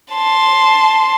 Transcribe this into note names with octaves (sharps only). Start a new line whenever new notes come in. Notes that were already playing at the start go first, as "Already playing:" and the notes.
A5 C6